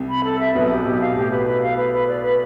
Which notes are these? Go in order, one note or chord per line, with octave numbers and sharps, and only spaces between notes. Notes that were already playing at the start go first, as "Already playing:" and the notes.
Already playing: C2 C3
B5
A4
E5
B1 B2 B4
G4
B1 B2 G4
F5
B2
A2 G4
B4
B4
F5
B4
B4
D5
B4